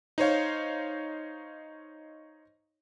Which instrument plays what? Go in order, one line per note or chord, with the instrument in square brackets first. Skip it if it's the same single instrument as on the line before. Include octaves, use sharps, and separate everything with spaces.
[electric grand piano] D#4 C5 C#5 F5